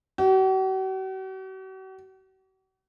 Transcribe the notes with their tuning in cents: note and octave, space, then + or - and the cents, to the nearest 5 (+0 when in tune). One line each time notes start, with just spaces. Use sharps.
F#4 +45